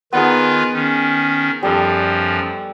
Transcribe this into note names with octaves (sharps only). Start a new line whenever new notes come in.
D#3 B3 D#4 F4 G#4 B4
D#3 C#4
F#2 F3 G3 A4